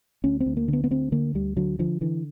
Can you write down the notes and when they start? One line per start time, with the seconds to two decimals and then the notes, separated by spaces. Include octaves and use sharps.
0.24 D2 C#4
0.40 C4
0.46 D2
0.57 A#3
0.68 D3
0.73 B3
0.84 B3
0.91 D2 C4
1.12 D3 A#3
1.34 D2 G3
1.57 D3 F#3
1.79 D3 F3
2.01 D3 E3